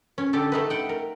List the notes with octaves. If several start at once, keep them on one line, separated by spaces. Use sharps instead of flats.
C#4
D3 G4 A4
A3 D#4 B4
F#5 G5
A#4